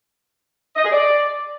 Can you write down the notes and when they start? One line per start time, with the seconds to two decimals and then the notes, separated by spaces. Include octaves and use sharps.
0.76 D#5
0.84 G#4
0.92 D5